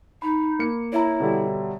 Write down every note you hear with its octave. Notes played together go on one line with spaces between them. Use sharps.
D#4 B5
A#3 C#7
E4 C#5 E5 A#5
B2 D3 G3